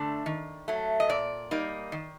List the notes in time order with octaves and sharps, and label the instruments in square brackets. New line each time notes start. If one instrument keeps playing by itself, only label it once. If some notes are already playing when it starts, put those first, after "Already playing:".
Already playing: [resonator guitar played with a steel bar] D3 A3 D4
D#3
F#3 A3
D#5
A#2 D5
G3 A#3 D#4
D#3